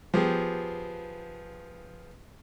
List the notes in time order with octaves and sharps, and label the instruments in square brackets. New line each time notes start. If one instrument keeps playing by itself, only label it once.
[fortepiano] F3 B3 G4 G#4